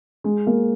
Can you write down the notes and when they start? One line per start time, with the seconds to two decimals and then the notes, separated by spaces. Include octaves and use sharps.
0.24 G#3
0.47 A#3